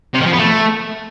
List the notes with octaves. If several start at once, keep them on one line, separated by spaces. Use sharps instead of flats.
C3
D#3
F3
B3
A3